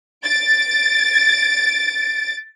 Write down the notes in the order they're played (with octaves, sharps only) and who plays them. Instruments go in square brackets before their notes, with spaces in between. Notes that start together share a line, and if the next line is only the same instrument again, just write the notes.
[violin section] A6 D7